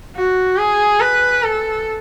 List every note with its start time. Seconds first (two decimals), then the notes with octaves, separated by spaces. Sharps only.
0.16 F#4
0.57 G#4
1.00 B4
1.43 A4